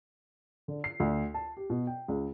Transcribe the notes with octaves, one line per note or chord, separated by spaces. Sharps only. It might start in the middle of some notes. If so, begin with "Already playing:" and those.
D3
C7
D2
A5
G4
B2
G5
C#2